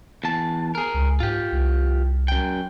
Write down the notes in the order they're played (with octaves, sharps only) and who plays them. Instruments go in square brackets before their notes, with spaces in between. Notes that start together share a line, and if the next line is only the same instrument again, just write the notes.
[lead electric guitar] E2 A5
G#4 A#4
[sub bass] C#2
[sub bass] G#2 [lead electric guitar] F4 G4
[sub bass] C2
[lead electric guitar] F#2 G5